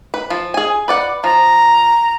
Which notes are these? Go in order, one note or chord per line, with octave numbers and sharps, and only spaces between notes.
B4
F3
G#4 G#5
B4 D5 F#5
F3 A#5